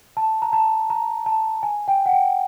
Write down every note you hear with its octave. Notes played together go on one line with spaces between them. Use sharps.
A5
A#5
A5
A#5
A5
G#5
G5
F#5
G5